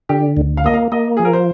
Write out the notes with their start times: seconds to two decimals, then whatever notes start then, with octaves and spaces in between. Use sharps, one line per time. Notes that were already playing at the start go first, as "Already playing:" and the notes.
0.09 D3 G4
0.37 D2
0.57 F5
0.64 A#3 D#5
0.74 F5
0.92 A#3 D#5
1.17 F3 G#4
1.25 A#4
1.33 C5